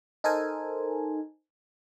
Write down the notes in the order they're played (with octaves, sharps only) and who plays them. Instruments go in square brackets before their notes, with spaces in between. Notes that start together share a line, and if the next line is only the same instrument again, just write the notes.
[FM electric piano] D#4 A4 A#4 C5 G#5